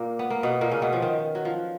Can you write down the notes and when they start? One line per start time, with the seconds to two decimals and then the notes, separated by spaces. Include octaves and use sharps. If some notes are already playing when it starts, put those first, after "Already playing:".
Already playing: A#2 A#3
0.19 B3
0.30 A#3
0.43 B2 B3
0.61 A#2 A#3
0.71 C#3 C#4
0.82 B2 B3
0.93 F3
1.02 D#3
1.35 F#3
1.45 F3